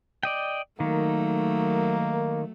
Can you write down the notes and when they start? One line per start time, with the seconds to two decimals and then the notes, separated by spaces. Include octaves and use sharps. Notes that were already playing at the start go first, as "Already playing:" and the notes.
0.23 D5 D#5 G5
0.80 D#3 F#3 A3 A#3